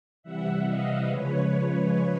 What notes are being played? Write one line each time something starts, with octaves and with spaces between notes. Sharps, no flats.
C3 E3 G3 E5 F#5
D#5 F5
C#3 F3 G#3 B4 C#5